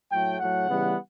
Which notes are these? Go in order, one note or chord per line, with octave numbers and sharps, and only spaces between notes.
A2 F#3 A3 G5
A2 F#3 A3 F#5
C#3 E3 G3 B3